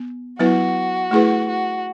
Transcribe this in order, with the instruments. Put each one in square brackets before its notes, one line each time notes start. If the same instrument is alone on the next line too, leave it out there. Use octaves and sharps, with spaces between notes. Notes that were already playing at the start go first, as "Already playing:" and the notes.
Already playing: [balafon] B3
[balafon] F#3 B3 E4 B4 [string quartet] F#4
[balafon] A3 E4 G#4 B4
[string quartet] F#4